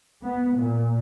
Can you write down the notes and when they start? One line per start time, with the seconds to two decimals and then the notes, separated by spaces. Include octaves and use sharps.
0.23 B3
0.55 A#2